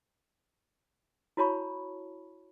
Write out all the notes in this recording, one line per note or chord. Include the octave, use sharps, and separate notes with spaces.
E4 F#4 C#5 A5 B5 C#6